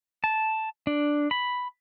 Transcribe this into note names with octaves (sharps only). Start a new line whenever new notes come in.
A5
D4
B5